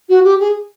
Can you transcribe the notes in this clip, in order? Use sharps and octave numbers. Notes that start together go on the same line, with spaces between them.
F#4
G4
G#4